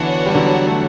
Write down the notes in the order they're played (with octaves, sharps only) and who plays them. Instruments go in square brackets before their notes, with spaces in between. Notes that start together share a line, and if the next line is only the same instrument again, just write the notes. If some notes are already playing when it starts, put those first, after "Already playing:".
Already playing: [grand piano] D3 E3 [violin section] B3 D4 F#4 C#5 F#5
[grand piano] G3
D3 F#3
A3